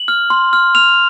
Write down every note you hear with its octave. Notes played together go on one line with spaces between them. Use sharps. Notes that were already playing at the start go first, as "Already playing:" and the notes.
Already playing: F#7
F6
C6
F6
F6 F7